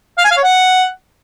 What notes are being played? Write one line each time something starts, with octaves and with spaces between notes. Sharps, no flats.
F5
G#5
F5
C#5
F#5